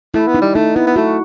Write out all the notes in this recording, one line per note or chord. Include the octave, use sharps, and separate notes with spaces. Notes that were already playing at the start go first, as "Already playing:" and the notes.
A3 E4
B3
D#4
G3
A3 D#4
B3 E4
B3
A3 F#4